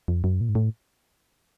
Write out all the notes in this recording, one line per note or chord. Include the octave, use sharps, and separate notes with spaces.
F2
F#2
A#2
G#2
A2